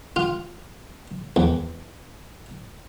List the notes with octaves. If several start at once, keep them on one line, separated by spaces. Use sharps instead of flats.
F4
E2